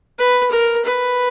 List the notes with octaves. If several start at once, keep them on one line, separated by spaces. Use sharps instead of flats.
B4
A#4
B4